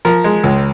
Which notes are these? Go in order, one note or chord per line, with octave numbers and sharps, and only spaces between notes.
F3 A#4
G#3
C#2